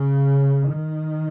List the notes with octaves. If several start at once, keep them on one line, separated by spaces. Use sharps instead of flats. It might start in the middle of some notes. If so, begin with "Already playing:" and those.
Already playing: C#3
D#3